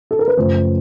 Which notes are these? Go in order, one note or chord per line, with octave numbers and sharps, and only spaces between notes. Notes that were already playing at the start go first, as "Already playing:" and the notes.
A4
A#4
B4
F#2 C#3 F3 A3 C5